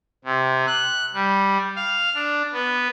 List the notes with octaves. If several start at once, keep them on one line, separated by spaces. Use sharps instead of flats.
C3
F#6
G3
F5
D4
B3